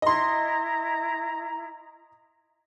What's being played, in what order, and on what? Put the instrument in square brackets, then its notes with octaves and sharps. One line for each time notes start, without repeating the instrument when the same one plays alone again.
[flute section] E4 A#5 [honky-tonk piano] D#5 C6